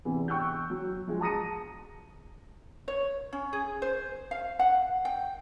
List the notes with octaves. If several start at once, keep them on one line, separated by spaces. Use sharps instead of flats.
E2 C3 E3
G5 C#6 E6 F#6 G6
F#3
F3 G#3
A5 A#5 D#6 A#6 C#7 D#7
C#5
C#4
G#4
C5
F5
F#5
G5